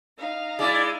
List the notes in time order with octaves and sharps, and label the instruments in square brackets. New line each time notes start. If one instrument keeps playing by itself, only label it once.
[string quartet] D#4 F5 A#5
[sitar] G#3 E4 [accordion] D5